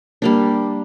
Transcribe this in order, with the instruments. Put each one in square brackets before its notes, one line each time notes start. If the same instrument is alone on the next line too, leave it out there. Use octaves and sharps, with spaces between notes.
[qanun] G3 A#3 D4